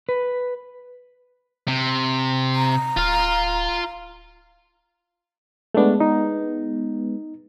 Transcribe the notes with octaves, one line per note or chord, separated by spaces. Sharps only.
B4
C3
A#5
D1 F4 F5
G#3 A3 B3 D4
D#4